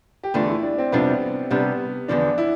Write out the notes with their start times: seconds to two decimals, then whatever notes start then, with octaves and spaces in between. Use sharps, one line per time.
0.23 G4
0.34 E2 D3 A3 D4 F4
0.49 E4
0.63 D4
0.78 C4
0.92 F2 C3 G3 B3 D4 F4
1.51 C3 G3 B3 D4
2.08 E2 D3 F3 D4
2.38 E4